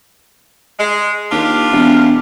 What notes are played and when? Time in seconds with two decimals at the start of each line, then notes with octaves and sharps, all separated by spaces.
0.80 G#3
1.31 D#2 D4 F4 G4
1.71 E1